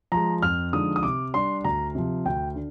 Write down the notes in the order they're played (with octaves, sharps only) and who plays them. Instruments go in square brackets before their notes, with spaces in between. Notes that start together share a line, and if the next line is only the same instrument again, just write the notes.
[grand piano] F3 G#3 A#5
F2 F6
D3 F3 G#3 D#4 D#6
D#6
C3 D6
G3 D4 C6
D2 A#5
C3 F3
D2 G5
D3